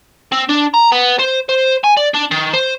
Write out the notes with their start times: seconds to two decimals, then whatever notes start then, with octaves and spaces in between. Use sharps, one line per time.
0.32 C4
0.49 D4
0.74 A#5
0.92 B3
1.19 C5
1.49 C5
1.84 G#5
1.97 D5
2.14 D4
2.31 D#3
2.54 C5